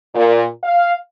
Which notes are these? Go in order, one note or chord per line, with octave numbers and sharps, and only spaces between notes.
A#2
F5